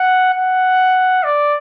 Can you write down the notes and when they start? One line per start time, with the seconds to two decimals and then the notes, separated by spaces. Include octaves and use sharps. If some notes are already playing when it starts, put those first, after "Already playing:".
Already playing: F#5
0.33 F#5
1.23 D5